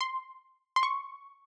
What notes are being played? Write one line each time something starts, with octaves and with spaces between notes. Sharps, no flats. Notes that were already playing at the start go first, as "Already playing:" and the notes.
C6
C6
C#6